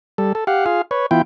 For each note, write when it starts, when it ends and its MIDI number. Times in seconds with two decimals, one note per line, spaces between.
0.18 0.33 55
0.18 0.33 69
0.35 0.44 69
0.47 0.65 67
0.47 0.65 77
0.47 0.65 78
0.66 0.82 65
0.66 0.82 68
0.66 0.82 77
0.91 1.06 71
0.91 1.06 73
1.11 1.22 52
1.11 1.22 59
1.11 1.22 64
1.11 1.22 65
1.11 1.22 79